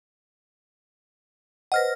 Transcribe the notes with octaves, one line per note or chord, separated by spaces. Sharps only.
B4 C5 D#5 F#5 F6 A#6